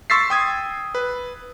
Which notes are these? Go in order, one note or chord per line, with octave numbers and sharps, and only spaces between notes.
C6 C#6 E6 A6 B6 C7
G5 D#6 G#6
B4